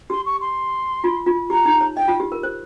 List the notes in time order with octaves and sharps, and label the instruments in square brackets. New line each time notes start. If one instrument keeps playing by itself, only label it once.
[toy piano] G4 [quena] C6
[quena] C#6
C6
[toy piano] F4
F4
[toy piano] G4 [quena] A#5
[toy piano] D#4
C#5
[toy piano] D#5 [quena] G5
[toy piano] F4
G4
A#4
C5